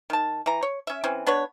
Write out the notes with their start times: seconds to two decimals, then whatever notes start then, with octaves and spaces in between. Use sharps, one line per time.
0.10 D#3 A5
0.46 E3 A#5
0.63 C#5
0.87 C#4 E5
1.04 E3 C4 C#4
1.27 B3 D4 B4 C#5